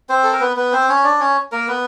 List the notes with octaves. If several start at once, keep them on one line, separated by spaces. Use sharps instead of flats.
C4 C5
A4
A#4
B3 B4
B3 B4
C4 C5
C#4 C#5
D4 D5
C#4 C#5
A#3 A#4
B3 B4